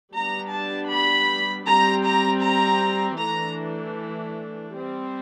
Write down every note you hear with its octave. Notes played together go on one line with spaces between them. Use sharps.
G3 B3 D4 A#5
A5
B5
G3 C4 A#5
A#5
A#5
E3 A3 D4 A#5
G3 C4